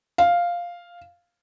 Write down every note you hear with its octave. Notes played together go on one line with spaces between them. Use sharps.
F5